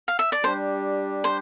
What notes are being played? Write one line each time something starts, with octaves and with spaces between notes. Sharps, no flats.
F5
E5
D5
G3 D4 G4 C5
C5